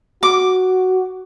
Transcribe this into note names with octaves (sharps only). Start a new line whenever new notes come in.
F#4 D6